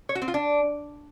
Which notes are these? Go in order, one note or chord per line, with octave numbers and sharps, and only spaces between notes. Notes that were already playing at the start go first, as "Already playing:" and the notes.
C#5
F#4
C4
F4
D4